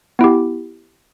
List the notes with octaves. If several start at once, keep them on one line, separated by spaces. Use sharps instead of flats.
B3 E4 G4